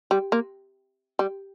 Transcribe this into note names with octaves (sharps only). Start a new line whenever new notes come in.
G3
A#3
G3